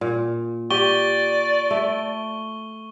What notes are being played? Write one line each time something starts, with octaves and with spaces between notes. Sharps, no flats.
A#2
G4 D5 C#6 G7
A3